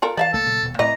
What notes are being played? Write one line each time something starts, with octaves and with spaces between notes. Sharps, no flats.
F4 A4 A#4
E3 D5 E5 F5 A5
C2 A3 A#3 A4
A#2 C#3 F#3
D#1 B2
A2 E3 A3 C4 D#5 A#5